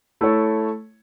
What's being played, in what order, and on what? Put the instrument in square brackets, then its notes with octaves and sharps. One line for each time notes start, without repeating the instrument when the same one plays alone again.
[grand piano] A3 E4 A4 C#5